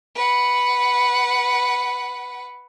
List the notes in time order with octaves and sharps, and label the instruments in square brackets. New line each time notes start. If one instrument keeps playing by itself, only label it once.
[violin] B4 F#5